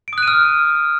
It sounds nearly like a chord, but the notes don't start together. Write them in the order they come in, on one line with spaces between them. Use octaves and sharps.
D7 D#6 F#6 D#7 F6